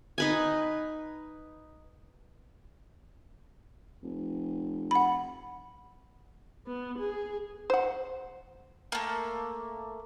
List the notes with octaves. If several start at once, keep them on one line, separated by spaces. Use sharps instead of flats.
D#4 B4 G#5
F1
F#5 B5
B3
G#4
C5 F#5
A3 A#3